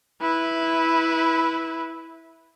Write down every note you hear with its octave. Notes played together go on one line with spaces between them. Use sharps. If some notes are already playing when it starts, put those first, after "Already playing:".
E4 B4